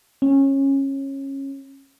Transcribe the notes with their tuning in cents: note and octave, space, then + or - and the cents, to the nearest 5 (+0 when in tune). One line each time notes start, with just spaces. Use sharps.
C#4 -20